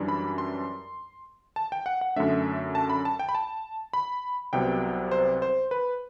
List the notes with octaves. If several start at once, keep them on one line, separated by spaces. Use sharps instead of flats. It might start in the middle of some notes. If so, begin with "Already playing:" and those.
Already playing: F#2 E3 G3 D4
B5
C6
A5
G5
F#5
F#5
F#2 D3 A3 D4 E5
A5
B5
A5
G5
B5
A5
B5
C2 C3 F#3 B3 G5
C5
C5
B4